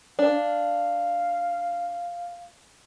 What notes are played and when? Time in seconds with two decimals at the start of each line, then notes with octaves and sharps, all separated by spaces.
0.19 D4 F5